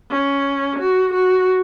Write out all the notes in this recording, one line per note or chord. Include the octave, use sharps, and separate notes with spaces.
C#4
F#4
F#4